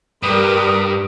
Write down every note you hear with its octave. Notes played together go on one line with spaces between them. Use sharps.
G2 G3 A#4 B4 D#6